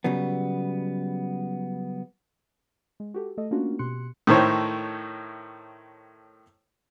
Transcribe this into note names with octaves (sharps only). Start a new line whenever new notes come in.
C#3 F#3 G3 B3
G#3
F#4 G4 A4
A3 A4 D#5
A3 A#3 C#4 D4 F4 F#4
B2 G4 C6 F#6 C#7
A2 D#3 A3 C5 C#5